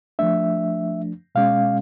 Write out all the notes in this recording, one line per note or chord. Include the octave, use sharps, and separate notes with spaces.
F3 A3 D4 E5
B2 G#3 C#4 F5